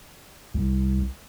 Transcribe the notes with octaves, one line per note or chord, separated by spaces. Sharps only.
C2